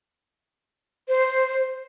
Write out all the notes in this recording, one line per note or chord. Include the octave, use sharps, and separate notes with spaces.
C5